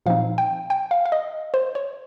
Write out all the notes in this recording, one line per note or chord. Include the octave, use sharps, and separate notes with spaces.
A#2 F3 C4 D#4 F5
G5
G5
F5
F5
D#5
C5
C#5